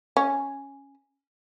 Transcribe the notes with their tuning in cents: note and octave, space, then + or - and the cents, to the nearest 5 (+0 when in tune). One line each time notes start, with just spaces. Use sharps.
C#4 -5